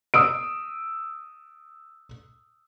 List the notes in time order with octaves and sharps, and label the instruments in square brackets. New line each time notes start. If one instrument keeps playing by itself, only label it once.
[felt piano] D#6 E6 D7